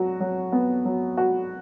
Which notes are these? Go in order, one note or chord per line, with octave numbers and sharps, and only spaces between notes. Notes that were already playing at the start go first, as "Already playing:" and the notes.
Already playing: F#3 F#4
F#3
B3
F#3
F#4